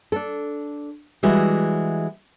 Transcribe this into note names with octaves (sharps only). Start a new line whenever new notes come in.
D4 A4
E3 G3 G#3 E4 F#4